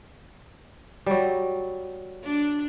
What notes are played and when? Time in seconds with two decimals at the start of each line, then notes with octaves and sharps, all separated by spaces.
1.06 F#3 G3
2.24 D4